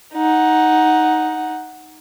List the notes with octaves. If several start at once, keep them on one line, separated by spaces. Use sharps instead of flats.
D#4 F#5